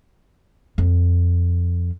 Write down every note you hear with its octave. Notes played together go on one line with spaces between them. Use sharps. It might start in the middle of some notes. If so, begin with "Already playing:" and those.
F2